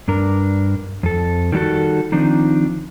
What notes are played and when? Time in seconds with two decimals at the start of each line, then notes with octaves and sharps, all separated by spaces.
0.08 G2 D4 A#4
1.03 F2 A4
1.52 D#3 G3 A#3 F#4 A4
2.12 D#3 F3 C4 D4 D#4